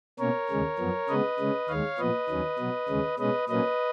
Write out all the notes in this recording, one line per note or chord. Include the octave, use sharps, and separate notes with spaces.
B2 A#3 C#4 A#4 C#5
D#2 C#3 G#3 C#4
F#2 F3 B3
C#3 G#3 B3 B4 D#5
C#3 G#3 C#4
D#2 D#3 G#3 C#5 F5
A#2 F3 B3 B4 D#5
D#2 D#3 F#3 C#4
B2 F#3 B3
D#2 C#3 G#3 C#4
B2 G#3 C#4 B4 D#5
A#2 F#3 A#3 C#4 B4 D#5